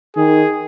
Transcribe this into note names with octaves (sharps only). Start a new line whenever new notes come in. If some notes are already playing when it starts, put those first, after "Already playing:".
D#3 G#4